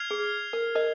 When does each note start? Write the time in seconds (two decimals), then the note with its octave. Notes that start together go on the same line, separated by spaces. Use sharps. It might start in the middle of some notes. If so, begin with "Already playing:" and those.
Already playing: F6 G#6 C7 F7
0.11 G#4
0.53 A#4
0.75 A#4 D#5